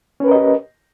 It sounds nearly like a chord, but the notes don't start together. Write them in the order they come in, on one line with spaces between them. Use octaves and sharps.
C#4 B4 A#4 D#5 G4